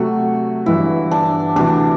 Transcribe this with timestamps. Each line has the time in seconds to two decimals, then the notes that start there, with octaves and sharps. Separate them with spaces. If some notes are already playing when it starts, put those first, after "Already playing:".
Already playing: C3 F#3 A3 F#4
0.66 G1 G2 E3 E4
1.11 D4
1.56 D2 C3 E3 D4